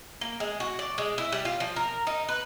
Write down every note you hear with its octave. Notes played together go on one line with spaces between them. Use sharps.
A#3
G#3
F#4
D5
G#3
E4
G3
F4
F3
A#4
D#4
B4